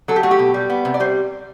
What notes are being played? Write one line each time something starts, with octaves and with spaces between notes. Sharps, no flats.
F#3 A4
G4
A3 F#4
G4
B2
G3
B3
C3
D5
G3 C5